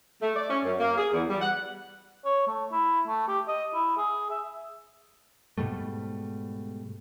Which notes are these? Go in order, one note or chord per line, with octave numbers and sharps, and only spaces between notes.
A3
D5
C#4
F#2
A#3
G#4
E2
G3
F#5
C#5
A3
E4
A3
G4
D#5
E4
G#4
E5
G#2 B2 G3 A3